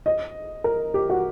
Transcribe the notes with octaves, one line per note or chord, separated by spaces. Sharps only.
D#5
A#4
G4
F#4